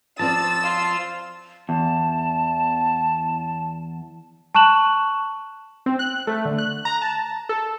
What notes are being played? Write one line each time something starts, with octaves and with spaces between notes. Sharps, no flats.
F3 C4 D5 A5 E6 A6
F4
E2 A5
A5 C#6 F#6 E7 F#7
C4
F#6
A3
D3
F#6
A#5
A5
A4